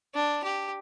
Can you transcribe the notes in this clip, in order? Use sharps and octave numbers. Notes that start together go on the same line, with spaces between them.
D4
G4